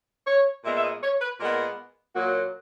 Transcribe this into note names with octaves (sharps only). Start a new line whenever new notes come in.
C#5
A#2 G#3 B3 E5
E5
D#5
C#5
B4
A#2 G#3 B3 A#4
A#2 F#3 A#3 F#4